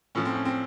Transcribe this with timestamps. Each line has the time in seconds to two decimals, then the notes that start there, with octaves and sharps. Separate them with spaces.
0.15 A2 F3 C#4
0.26 C4
0.35 C#4
0.45 C4